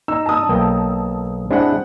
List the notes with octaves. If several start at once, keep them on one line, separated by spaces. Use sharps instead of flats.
D#4 E6
A5 D#6
B1 A#3 G5
G#3 C4 D4 E4 F#5